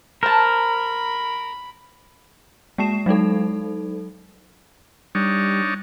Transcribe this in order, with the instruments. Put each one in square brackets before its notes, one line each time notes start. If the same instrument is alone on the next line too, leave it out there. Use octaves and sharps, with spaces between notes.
[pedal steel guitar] A#4 [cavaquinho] C5 A5 [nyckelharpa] B5
[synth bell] G#3 A#3 A5 C7 E7
F#3 G#3 D#4 A4
[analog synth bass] G3 [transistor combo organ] D4 D#4 C#5